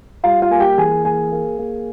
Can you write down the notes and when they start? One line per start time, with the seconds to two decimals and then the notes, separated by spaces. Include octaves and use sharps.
0.24 G3 F4 F5
0.42 F4 F5
0.51 A#3 G#5
0.60 G4 G5
0.78 E3 G#4 G#5
1.05 A#3 G#4 G#5
1.32 A#3
1.59 A#3